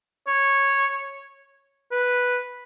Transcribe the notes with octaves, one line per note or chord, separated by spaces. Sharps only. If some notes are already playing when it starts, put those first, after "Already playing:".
C#5
B4